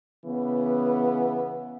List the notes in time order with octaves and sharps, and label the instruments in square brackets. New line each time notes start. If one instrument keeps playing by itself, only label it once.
[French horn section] C#3 E3 B3